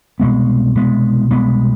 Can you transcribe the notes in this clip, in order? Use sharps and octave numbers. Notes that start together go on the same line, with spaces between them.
C2 B2 G#3 B3
C2 B2 G#3 B3
C2 B2 G#3 B3